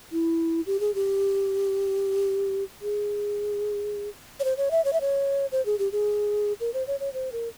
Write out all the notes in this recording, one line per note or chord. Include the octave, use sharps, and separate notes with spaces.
E4
G4
G#4
G4
G#4
C#5
C5
C#5
E5
C#5
E5
C#5
C5
G#4
G4
G#4
A#4
C5
C#5
C#5
C5
A#4